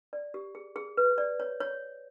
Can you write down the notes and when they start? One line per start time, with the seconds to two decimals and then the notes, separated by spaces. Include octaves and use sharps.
0.13 D5
0.34 G4
0.55 G#4
0.76 G#4
0.97 B4
1.18 D5
1.40 C#5
1.60 C#5